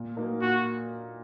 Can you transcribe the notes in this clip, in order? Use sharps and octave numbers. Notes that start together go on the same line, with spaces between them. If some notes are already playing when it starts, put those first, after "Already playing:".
Already playing: A#2
F#3 A#3 D#4 A#4
A#2 F#4